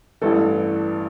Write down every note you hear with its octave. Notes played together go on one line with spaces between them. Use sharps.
A1 G2 E3 A4